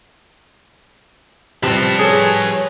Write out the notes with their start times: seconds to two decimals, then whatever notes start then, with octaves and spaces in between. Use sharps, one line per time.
1.63 C3 F3 G3 B4 A5
1.99 G#4 A4 C#5